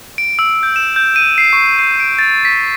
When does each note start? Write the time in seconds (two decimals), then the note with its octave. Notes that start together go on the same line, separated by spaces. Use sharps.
0.18 D7
0.39 E6
0.63 G6
0.76 E7
0.96 G6
1.16 D#7
1.38 C7
1.53 C#6
1.79 C7
2.00 D7
2.19 A6
2.45 B6